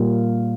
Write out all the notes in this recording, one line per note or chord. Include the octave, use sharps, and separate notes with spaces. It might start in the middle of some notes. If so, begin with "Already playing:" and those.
Already playing: A#2 G3 A#3